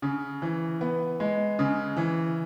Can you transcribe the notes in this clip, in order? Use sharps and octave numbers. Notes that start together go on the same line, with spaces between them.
C#3
E3
B3
G#3
C#3
E3